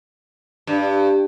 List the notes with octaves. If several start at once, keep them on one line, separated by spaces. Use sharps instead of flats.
G2